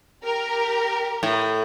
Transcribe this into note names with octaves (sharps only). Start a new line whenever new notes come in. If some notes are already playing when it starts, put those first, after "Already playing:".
G4 A#4
A2